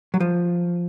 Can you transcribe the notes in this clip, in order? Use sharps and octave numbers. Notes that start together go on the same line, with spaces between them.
F#3
F3